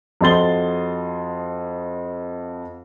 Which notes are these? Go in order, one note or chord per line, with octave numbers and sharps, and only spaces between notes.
F2 F#4 D#5 C6 A6 G7